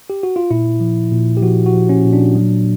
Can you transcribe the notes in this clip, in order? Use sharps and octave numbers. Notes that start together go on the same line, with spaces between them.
G4
F#4
F4
A#2 E4
F3
A#2
G4
F3 F#4
F#4
F3
C#4
A#2
D4
F#3